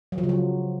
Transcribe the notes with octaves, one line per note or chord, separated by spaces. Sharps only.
F#3
F3
C#3
F#3